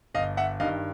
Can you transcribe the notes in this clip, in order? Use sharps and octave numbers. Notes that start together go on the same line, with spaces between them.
G1 D#5 F5
E5 F#5
G2 D#3 D#5 F5